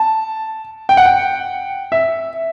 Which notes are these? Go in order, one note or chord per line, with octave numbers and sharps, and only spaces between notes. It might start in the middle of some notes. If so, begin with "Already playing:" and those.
Already playing: A5
G5
F#5
G5
E5